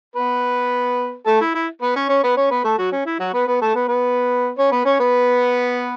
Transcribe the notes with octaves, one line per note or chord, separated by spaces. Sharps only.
B3 B4
A3 A4
E4
E4
B3 B4
C#4 C#5
C#4 C#5
B3 B4
C#4 C#5
B3 B4
A3 A4
F#3 F#4
C#4
E4
F#3 F#4
B3 B4
B3 B4
A3 A4
B3 B4
B3 B4
C#4 C#5
B3 B4
C#4 C#5
B3 B4